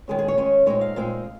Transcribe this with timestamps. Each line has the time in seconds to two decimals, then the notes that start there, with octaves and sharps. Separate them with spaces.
0.08 D#3 G#3 C#4 G#4
0.19 G#4
0.28 C#5
0.37 D#3 G#3 C#4
0.66 A#2 G#3 C4 D#4 C#5
0.81 F5
0.96 A#2 G#3 C4 D#4